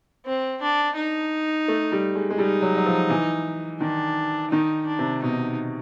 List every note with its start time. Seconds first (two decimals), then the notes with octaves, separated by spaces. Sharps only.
0.26 C4
0.62 D4
0.97 D#4
1.68 A3
1.92 G3
2.15 G#3
2.30 G#3
2.38 G3 D#4
2.62 F#3
2.77 F#3
2.86 F3
3.10 E3
3.81 D#3 D4
4.51 D#3 D#4
4.87 D4
4.99 C3
5.22 B2 D#4